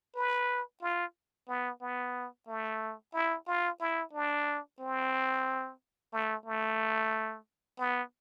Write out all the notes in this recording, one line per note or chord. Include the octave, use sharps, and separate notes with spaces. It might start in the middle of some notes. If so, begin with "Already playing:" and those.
B4
F4
B3
B3
A3
E4
F4
E4
D4
C4
A3
A3
B3